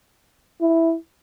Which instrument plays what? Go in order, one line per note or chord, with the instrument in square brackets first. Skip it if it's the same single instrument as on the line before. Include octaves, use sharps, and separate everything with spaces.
[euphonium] E4